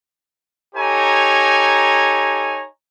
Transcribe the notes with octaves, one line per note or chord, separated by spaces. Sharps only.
D#4 G4 A4 C#5 G#5 A#5